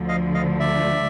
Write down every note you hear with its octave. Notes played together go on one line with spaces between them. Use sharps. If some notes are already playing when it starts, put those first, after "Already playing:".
Already playing: D2 D3 F3
D#5 F5
D#5 F5
D5 E5